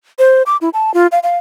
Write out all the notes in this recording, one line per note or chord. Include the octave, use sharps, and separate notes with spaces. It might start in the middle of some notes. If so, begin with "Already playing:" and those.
C5
D6
E4
A5
F4
F5
F5